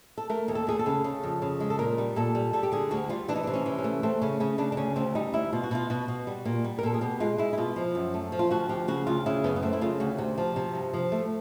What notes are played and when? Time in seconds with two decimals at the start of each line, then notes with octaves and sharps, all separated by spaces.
0.18 A4
0.30 A3 A#4
0.48 D#2
0.55 A4
0.67 D#2 G#4
0.79 A4
0.86 C#3
1.04 C#3
1.24 F2
1.42 C#3
1.60 G#3
1.70 A4
1.79 A#2 A#4
1.98 G3
2.16 A#2 A4
2.35 G3
2.53 G3 A4
2.63 G4
2.72 D3 G#4
2.91 D2 F#4
3.09 G3 F4
3.28 E3 D4
3.36 D#4
3.43 C3 D4
3.53 C#4
3.66 E3
3.78 C#4
3.84 A3
4.03 A3 C4
4.22 C#3 C#4
4.40 C#3 C#4
4.58 C#3 D4
4.72 D4
4.77 D2 C#4
4.96 D2 C4
5.15 G3 D#4
5.33 D2 E4
5.53 B2 F4
5.63 F#4
5.71 B2 F4
5.90 B2 F#4
6.08 B2
6.27 G3
6.45 A#2
6.64 G3
6.79 A#4
6.83 A#2 A4
6.94 G#4
7.01 B2 G4
7.20 G#3 F4
7.38 G#3 E4
7.53 E4
7.58 B2 F4
7.76 F3
7.95 F#2
8.14 A3
8.32 F3
8.39 F4
8.51 D2 F#4
8.69 F3 G4
8.88 C#3 F#4
9.07 D2 F4
9.26 C#3 E4
9.44 F#2 B3
9.56 B3
9.62 A3 C4
9.73 E4
9.81 C#3 F4
10.00 D2 F#4
10.18 C3
10.38 F3
10.56 C3
10.75 G2
10.94 F3
11.12 A3